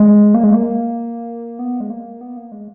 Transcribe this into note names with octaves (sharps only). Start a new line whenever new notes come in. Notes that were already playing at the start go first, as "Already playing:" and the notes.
Already playing: G#3
A#3
G#3
A#3
B3
G#3
A#3
B3
A#3
G#3